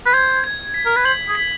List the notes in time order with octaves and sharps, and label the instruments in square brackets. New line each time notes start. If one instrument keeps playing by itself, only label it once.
[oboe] B4
[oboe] C5 [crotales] G#6
[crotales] G#6
B6
[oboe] A#4
B4
[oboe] C5 [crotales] F#7
[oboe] G#4
[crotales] B6